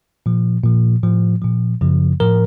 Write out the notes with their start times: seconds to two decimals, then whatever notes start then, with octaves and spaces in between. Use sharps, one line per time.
0.26 A#2 F3
0.64 A#2 F3
1.03 A2 F3
1.42 A#2 F3
1.81 F#2 C#3 F3
2.20 A2 F3 A#4